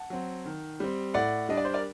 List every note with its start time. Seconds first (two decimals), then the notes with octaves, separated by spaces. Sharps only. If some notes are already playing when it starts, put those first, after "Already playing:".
Already playing: F#5 A5
0.10 F#3 C4
0.45 D#3
0.80 G3 C4
1.14 A2 D5 F#5
1.49 G3 D4 D#5
1.57 D5
1.65 C5
1.73 A#4 D5